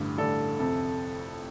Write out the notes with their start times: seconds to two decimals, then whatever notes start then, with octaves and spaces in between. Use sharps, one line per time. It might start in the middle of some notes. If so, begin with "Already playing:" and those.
Already playing: A1 G2 D3
0.18 A1 G2 D3 A4 D5
0.59 F2 C3 A4